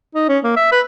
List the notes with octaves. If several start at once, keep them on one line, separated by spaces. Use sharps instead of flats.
D#4
C#4
A#3
E5
B4